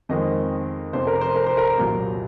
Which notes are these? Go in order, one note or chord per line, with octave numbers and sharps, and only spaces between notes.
F2 D#3 G#3 C4 D#5
F1 F2 C3 C5
A#4
C5
A#4
C5
A#4
C2 A#2 F#3